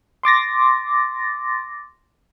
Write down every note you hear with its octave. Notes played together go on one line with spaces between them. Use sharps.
C6 D6 A6 A#6